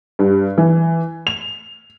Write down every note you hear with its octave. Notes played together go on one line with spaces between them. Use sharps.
G2
E3
F7